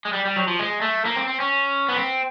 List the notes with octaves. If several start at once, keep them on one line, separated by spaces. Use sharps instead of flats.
G#3
G3
G3
F#3
F3
G#3
A3
A#3
C4
C4
C#4
B3
C4